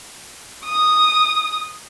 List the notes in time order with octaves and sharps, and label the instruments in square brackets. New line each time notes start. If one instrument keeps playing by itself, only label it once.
[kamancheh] D#6